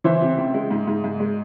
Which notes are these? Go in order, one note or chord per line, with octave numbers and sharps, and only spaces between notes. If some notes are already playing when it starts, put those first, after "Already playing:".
E3 C5 E5
C3
C#2
G#3
G#2
G#2
G#2
G#3